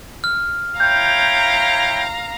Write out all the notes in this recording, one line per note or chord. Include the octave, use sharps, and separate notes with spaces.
F6
E4 C#5 F5 G5 A#5 G6